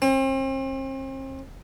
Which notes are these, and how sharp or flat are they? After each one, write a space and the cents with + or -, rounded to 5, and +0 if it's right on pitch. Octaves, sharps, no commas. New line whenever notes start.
C4 +40